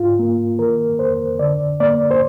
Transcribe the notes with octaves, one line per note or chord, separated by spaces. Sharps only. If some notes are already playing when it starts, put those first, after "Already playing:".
Already playing: G#2 F4
A#3
D#3 A#4
F2 C5
D3 D5
A#3 D5
C5